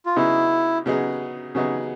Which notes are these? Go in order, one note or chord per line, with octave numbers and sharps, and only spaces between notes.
F4
C#3 F#3 B3 D#4 E4 G#4
C#3 F#3 B3 D#4 G#4
C#3 F#3 B3 D#4 G#4